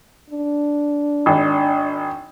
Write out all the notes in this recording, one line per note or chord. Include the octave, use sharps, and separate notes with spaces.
D4
G#1